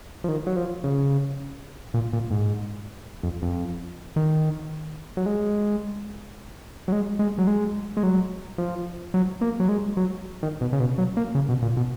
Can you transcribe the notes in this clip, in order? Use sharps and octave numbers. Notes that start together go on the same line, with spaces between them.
F3
D#3
F#3
F3
C#3
A#2
A#2
G#2
F2
F2
D#3
F#3
G#3
F#3
G#3
G#3
F#3
G#3
G#3
F#3
F3
F#3
A#3
F#3
G#3
F#3
D#3
B2
C#3
B2
F#3
A#3
C#3
B2
A#2
B2